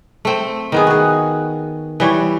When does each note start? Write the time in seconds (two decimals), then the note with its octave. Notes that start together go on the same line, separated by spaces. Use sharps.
0.25 A3 C4
0.72 D#3 B3 G#4
0.87 F#4 G#4
2.00 E3 G3 C#5